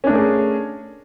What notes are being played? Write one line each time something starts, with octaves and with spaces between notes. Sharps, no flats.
A3 C#4 D4 G#4 A#4